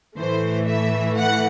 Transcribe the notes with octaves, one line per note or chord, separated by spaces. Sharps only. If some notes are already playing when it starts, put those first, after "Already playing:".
A2 E3 A3 C5
E5
F#5